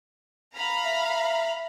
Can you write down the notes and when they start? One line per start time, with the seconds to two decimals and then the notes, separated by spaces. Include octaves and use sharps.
0.55 F5 A#5 B5
0.84 E5